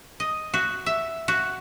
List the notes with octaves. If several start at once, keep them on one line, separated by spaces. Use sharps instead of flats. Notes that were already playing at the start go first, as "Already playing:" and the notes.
D#5
F#4
E5
F#4